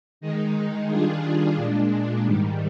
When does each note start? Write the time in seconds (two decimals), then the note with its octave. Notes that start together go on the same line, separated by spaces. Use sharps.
0.21 D#3 G#3 D#4
0.88 D#3 G3 D4 F4 G#4
1.56 A#2 G#3 D4
2.24 G#2 D#3 G3